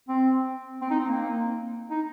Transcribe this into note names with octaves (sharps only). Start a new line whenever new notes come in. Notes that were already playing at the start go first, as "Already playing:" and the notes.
C4
C4
D#4
C4
A#3
D#4